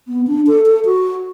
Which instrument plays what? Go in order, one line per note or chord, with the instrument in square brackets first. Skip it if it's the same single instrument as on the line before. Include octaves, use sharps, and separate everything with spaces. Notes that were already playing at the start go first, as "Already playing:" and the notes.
[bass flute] B3
D4
A4
A4
F#4